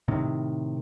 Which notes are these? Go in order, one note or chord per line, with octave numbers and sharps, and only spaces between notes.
A2 C3 D#3